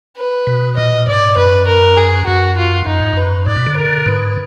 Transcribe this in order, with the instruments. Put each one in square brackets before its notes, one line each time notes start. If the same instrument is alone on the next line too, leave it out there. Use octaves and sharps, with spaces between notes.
[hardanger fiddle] B4
[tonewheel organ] B2
[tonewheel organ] A#2 [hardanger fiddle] D#5
[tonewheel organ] G#2 [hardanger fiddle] D5
[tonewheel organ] F#2 [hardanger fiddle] B4
[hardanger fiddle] A#4
G#4
[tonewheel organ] F#2 [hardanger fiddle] F#4
[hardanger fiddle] F4
[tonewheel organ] F#2 [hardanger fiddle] D#4
[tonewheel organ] G#2
[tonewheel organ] F#2 [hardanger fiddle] B4
[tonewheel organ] G#2 [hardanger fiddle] D5
[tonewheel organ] B2
D3
[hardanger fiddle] A#4
[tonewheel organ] G#2 [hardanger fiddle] B4